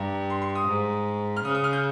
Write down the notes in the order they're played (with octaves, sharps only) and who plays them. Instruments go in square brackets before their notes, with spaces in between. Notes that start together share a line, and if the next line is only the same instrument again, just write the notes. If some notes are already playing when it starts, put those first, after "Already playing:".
Already playing: [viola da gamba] G2 [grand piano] A#5
[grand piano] C6
C6
D#6
[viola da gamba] G#2
[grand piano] F6
[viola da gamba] C#3 [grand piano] D#6
[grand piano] D#6
F6
G6